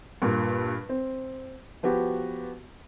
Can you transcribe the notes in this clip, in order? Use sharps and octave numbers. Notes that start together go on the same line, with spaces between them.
G2 A#2
C4
F3 B3 F#4 G4